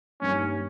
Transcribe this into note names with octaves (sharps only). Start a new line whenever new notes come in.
G2 D#3 G3 A#3 C#4